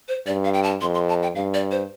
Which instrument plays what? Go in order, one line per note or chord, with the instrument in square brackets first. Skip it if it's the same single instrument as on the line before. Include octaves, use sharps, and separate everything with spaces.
[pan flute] C5
[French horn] G2 [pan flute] D5
[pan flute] F5
G5
A5
[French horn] F2 [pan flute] C6
[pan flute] C6
A5
G5
[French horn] G2 [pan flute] F5
[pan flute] D5
C5